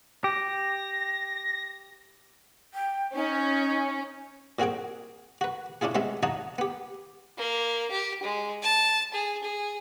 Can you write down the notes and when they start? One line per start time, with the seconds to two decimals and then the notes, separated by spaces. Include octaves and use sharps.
0.24 G4 A#6
2.74 G5
3.15 C#4 D#4
4.59 A#2 C4 F#4 G#4 G5
5.41 F#4 B4
5.81 C#4 D4 E4 F4 G#4
5.95 C3 G#3 B3 C#4 E5 C6
6.23 D#4 F#4 C#5 D#5 F5 A5
6.58 B3 G4
7.38 A#3
7.91 G4
8.23 G#3
8.63 A5
9.14 G#4
9.43 G#4